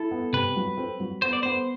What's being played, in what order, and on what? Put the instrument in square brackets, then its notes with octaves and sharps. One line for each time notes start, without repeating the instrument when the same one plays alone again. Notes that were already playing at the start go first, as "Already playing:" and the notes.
Already playing: [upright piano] E4 [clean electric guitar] A4
[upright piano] B3
[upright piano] C3 [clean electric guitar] B4
[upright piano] F#3
C4
F#3
[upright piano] B3 [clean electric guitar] C5
[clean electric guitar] D5
[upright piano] B3 [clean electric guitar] C5